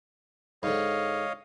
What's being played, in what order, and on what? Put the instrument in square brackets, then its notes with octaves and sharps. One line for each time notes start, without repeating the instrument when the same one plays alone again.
[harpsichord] G#2 D3 [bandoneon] C#5 D#5 F5